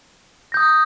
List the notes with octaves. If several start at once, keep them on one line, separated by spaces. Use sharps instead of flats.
D#6 G6 A#6